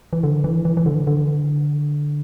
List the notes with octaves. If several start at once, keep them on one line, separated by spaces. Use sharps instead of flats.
E3
D3
E3
E3
E3
D3
D3